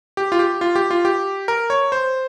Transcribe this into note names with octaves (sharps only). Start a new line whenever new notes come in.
G4
F4
G4
F4
G4
F4
G4
A#4
C#5
C5